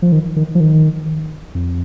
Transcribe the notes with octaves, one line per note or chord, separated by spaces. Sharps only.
F3
D#3
D#3
F3
D#3
F2